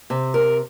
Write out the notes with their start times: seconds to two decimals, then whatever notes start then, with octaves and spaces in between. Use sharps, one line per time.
0.10 C3
0.34 A#4